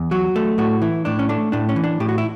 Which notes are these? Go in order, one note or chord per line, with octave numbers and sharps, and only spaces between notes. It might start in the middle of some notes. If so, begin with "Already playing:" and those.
Already playing: E2
F#3 F#4
A3
A2 F#4
E3 E4
A2 D4
C#4
A3 D4
A2 D4
C#4
E3
D4
A2 G4
F#4
E4